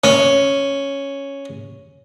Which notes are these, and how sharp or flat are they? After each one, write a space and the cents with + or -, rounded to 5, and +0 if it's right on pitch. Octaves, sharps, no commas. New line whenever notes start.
C#4 +0